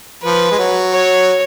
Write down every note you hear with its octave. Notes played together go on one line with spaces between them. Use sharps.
F3 B4
G#3
F#3
C#5